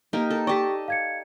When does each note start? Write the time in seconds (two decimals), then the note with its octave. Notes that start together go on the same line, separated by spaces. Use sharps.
0.13 A#3 D#4 G4 A#4
0.30 A4
0.47 G4 D5 D#5 G5 A5 C#6 B6
0.88 F5 G#6 C#7